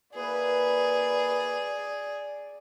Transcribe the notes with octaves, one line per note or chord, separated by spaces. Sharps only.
A#3 E4 G#4 B4 D5